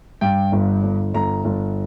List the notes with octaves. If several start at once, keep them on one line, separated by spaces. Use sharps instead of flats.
G2 G5
G1
G1
G1 A#5
G1